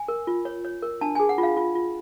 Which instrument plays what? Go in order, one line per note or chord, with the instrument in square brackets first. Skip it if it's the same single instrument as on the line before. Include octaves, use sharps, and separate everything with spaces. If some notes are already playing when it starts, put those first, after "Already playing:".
Already playing: [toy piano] G#5
A#4
F4
C#5
C#5
A#4
D4 A5
G#4 G#5
F#5
F4
F5
F4
F4